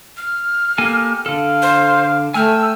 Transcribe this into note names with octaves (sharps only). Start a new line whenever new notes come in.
F6
A#3 G4 A4 G#5
D3 A4 F5
C5
A3 G5 G#5 E6 F6